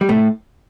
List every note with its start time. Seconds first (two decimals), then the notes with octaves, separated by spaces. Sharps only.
0.01 G3
0.09 C2 A2 A3